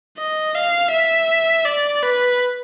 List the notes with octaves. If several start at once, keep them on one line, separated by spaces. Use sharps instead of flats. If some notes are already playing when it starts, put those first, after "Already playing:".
D#5
F5
E5
D5
B4